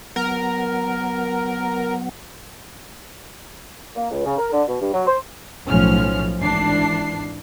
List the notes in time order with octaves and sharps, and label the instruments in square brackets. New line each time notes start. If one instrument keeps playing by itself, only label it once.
[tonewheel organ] F#3 B3 F#5 [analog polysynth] A#4
[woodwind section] A#3
C#2
C#3
A#4
D3
B2
G2
F#3
C5
[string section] B1 A2 F3 C#4 F6
G#1 E3 D4 C7